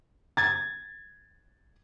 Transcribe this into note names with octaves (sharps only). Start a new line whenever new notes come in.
G#6 A6